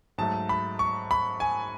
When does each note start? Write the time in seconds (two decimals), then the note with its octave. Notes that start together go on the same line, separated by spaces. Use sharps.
0.18 G#2 F#3 A3 A5
0.49 B5
0.79 C#6
1.11 B5
1.40 G#5